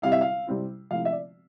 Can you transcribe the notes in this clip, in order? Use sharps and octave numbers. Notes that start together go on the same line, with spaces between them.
C3 G3 C4 E4 F5
E5
F5
C3 G3 C4 E4
C3 F3 A3 E4 F5
E5
D5